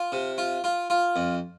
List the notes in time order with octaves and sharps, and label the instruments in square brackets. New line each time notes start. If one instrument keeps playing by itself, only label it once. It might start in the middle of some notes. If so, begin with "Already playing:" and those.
Already playing: [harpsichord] F4
C3
F4
F4
F4
F2